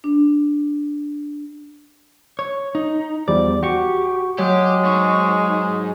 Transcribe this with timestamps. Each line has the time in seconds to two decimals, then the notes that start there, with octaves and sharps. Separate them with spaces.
0.04 D4
2.39 C#5
2.75 D#4
3.28 E2 F3 G3 D5
3.63 F#4 G4 C#6
4.38 F#3 G#3 G4 C#5
4.85 G#2 C#6